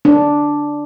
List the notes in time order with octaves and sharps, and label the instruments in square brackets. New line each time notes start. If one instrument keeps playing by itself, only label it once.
[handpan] D4